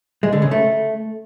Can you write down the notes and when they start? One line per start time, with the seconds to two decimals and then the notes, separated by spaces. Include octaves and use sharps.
0.23 G#3
0.32 D3
0.42 C#3
0.51 A3